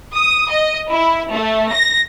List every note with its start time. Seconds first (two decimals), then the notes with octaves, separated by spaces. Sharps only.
0.15 D#6
0.50 D#5
0.91 E4
1.32 A3
1.71 A#6